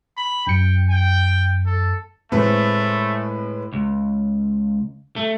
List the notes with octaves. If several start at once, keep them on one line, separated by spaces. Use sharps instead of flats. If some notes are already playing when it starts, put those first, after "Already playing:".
B5
F#2 G5 C#7
G5
A4
A2 G#3 A3 C4 B4
C#2
A3